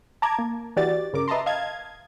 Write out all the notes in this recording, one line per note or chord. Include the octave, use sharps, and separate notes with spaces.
A5 A#5 D6 G#6
A#3
E3 F#4 G4 D5 A6
G1 C#3 A#4 D6
B4 D#5 E5 A5 A#5 C6
D#5 F5 A5 G#6